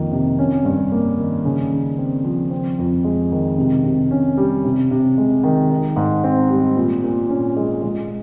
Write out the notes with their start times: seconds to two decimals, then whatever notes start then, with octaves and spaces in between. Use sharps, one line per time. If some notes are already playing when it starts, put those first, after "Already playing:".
Already playing: F2 D#3 A#3
0.12 C3
0.39 C#4
0.65 G2
0.92 A#3
1.19 D#3
1.45 C#3
1.72 C#3
1.98 C4
2.24 F3
2.51 C4
2.79 F2
3.05 G#3
3.32 D#3
3.58 C3
3.84 C3
4.11 C#4
4.37 G3
4.65 C3
4.91 C3
5.18 G#3
5.43 D#3
5.70 D#4
5.96 G#2
6.24 C4
6.50 G3
6.76 A#2
7.04 A#2
7.29 C#4
7.57 G#3
7.83 G#3